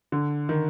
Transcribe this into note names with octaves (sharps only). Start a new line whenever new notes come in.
D3
D#3